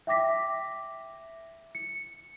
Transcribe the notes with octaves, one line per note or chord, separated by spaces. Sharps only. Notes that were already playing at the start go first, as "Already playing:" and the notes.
E5 G5 D6 A#6 B6
C#7